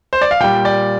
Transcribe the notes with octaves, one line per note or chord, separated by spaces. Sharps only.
C5
D5
F5
A#2 G3 G5
D5